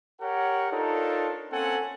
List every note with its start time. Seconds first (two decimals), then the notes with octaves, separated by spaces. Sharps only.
0.20 G4 A#4 C#5 F#5
0.71 D4 D#4 F4 A4 A#4 C#5
1.51 A#3 C4 C#4 A4 F#5 G#5